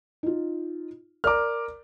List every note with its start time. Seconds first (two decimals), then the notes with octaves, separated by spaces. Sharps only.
0.23 D#4 F4
1.24 A#4 D5 A#5 D6 F6